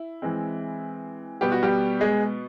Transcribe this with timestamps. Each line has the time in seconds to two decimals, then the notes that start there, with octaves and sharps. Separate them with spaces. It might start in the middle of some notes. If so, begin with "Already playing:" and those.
Already playing: E4
0.22 E3 G#3 C4
1.41 B2 G3 B3 G4
1.52 F#4
1.63 G3 G4
2.01 G#3 G#4